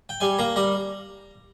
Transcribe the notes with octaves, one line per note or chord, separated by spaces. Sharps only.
G5
G3 G#5
A#3 A#5
G3 A#5